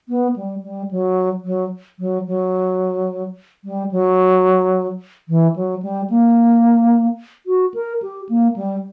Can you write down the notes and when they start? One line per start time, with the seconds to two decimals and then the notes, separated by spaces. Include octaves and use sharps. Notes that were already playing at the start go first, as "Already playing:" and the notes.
0.09 B3
0.36 G3
0.63 G3
0.91 F#3
1.45 F#3
1.99 F#3
2.27 F#3
3.65 G3
3.91 F#3
5.29 E3
5.56 F#3
5.83 G3
6.10 A#3
7.47 F#4
7.74 A#4
8.02 G4
8.29 A#3
8.56 G3